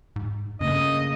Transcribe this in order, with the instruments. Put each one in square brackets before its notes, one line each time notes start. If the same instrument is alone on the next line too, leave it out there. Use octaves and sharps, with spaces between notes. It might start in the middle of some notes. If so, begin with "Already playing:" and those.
[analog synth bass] G#2
[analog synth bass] G2 [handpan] C#3 A3 A#3 [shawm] D#5